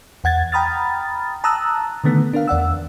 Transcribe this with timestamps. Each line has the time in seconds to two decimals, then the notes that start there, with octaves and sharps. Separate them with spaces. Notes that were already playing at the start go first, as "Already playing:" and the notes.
0.24 E2 F#5 G#6 A6
0.52 G5 A#5 B5 D#6 F6 A6
1.44 A5 A#5 D#6 E6 F#6
2.04 D3 D#3 A3 B3
2.33 D4 A#4 F5
2.48 E2 D5 F#5 E6